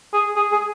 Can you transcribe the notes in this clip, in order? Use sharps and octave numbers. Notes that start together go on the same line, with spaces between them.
G#4
G#4
G#4